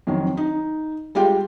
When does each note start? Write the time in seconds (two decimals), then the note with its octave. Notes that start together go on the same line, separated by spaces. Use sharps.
0.07 F2 D#3 F#3
0.37 D#4
1.15 G3 G#3 F4 G4 G5